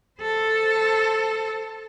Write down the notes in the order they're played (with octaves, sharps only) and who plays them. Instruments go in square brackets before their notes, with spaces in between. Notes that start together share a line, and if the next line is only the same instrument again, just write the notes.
[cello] A4 C5